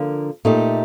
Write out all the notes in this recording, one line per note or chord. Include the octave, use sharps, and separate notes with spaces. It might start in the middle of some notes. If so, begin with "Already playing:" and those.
Already playing: D3 F3 A#3
A#2 A3 D#4 G4